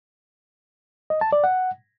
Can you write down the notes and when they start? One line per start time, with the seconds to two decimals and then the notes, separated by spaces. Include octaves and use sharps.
1.10 D#5
1.21 A5
1.32 D5
1.44 F#5